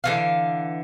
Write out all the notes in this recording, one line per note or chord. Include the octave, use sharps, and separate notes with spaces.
D3 E3 F5